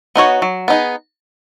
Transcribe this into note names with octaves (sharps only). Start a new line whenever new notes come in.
B3 D#4 F#4 C#5
F#3
B3 D#4 G#4